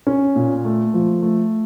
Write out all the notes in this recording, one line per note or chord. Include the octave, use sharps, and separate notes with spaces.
C#4
A#2
A3
F3
A3